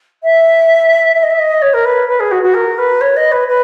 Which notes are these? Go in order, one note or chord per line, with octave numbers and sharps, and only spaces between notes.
E5
E5
D#5
E5
D#5
C#5
A#4
B4
B4
G#4
F#4
F#4
A#4
B4
C#5
D#5
B4
B4